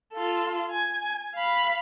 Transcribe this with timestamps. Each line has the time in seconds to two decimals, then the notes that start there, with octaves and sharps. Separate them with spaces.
0.13 F4 A4
0.71 G#5
1.35 F5 B5